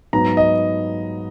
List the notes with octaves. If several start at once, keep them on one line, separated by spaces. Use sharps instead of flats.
G#2 F#3 B3 A#5
D#5